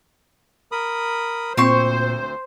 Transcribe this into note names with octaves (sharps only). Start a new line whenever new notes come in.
A#4 B5 D#6
D2 A#2 C4 C5 C6 C#6